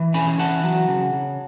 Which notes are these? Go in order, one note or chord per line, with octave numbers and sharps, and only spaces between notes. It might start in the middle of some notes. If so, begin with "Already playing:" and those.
Already playing: E3
C#4 G#5 B5
E3 F#5 A5
F#3
C#3
C#3